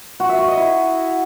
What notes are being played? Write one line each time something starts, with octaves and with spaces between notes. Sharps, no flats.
F#4
E5
F#4
D#5
E4